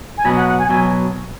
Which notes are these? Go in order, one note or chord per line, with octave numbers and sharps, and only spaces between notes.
G#5
B2 F#3 B3 B5
F#5
F#5
G#5
B2 F#3 B3 G#5